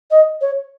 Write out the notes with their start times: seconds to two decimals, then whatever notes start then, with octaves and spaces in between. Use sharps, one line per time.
0.11 D#5
0.41 C#5